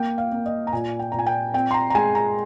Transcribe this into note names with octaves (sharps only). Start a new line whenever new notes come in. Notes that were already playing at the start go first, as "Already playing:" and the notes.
Already playing: A#3 G5
F5
A#3
D#5
A#5
A#2 G#5
G5
A#2 A#5
G#5
G5
C4 G5
C6
A#5
A#5
G#3 G#5
A#5